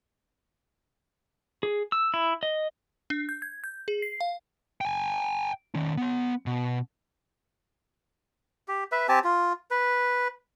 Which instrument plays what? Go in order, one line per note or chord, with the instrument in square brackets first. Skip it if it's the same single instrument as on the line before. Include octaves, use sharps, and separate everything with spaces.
[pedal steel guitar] G#4
E6
E4
D#5
[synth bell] D4
G6
G#6
G6
G#4
C7
F5
[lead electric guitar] G5 G#5
D#3 C#4
B3 C6
B2
[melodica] G4
B4 E5
C4 G4 G#5 A5
F4
B4